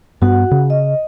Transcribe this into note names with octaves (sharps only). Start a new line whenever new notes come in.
G2 B3 F#4 F#5
C#3
D#5